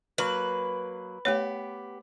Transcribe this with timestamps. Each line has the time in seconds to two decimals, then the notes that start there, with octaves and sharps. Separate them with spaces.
0.18 F#3 A#3 B4
1.25 A3 B3 G4 C#5